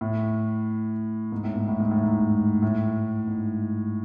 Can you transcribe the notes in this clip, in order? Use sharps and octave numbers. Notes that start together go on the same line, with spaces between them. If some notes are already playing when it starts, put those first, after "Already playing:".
A2
G#2
A2
G#2
A2
G#2
A2
G#2
A2
G#2